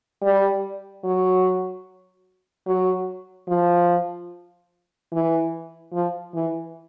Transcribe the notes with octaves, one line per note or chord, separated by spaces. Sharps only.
G3
F#3
F#3
F3
E3
F3
E3